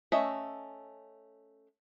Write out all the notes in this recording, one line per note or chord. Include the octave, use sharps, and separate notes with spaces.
A3 C#4 D#5 E5